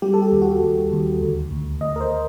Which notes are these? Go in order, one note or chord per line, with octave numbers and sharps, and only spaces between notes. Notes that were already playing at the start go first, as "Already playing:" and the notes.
G3 G4
A4
G4
D#2
F#4
D#2
D#2
D2
D2
D2 D#5
A#4
C5